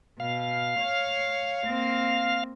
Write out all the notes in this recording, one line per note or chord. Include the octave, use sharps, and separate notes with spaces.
B2 F5
C#5
A#3 C4